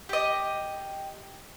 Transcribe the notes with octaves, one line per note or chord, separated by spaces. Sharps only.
G4 D#5